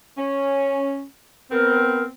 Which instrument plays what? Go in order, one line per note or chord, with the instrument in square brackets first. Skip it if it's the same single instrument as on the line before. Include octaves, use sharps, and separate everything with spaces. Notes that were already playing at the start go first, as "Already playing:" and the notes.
[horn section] C#4
[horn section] B3 C4 [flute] A#4